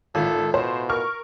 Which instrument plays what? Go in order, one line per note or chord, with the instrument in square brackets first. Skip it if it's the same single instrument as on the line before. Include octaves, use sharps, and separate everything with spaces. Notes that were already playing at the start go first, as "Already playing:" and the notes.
[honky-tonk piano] G#1 [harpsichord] A2 F4 [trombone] A4
[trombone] B2 [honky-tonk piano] C5
[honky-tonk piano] A#4 C#6 F6